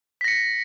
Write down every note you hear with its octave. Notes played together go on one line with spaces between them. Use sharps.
A#6 B6 C#7